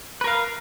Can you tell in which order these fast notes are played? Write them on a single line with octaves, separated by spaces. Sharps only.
B4 A#4 F5